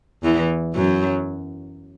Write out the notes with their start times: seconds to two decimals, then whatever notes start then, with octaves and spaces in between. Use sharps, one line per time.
0.23 E2 E3
0.75 F#2 F#3